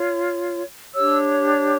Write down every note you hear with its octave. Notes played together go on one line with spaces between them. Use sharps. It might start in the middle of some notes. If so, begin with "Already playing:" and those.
Already playing: F4 C#5
D4 G4 C#5 E6